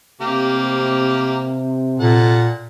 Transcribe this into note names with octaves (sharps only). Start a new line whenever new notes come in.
C3 A#3 G4 F5
A#2 A4 F#5